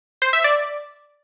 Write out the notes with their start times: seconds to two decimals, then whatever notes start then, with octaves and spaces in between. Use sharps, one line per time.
0.22 C5
0.33 E5
0.44 D5